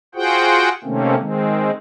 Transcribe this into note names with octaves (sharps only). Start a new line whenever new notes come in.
F4 F#4 G#4 C5 F#5 G5
C3 D#3 A3 A#3 C4 C#4
D#3 G#3 C4